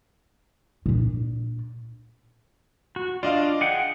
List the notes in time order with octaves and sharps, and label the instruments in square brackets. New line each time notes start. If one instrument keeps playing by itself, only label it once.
[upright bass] A#2 D4
[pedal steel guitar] F#4
[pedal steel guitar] D4 F4 [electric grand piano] D5 D#5 F5
[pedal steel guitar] G#4 F#5 G5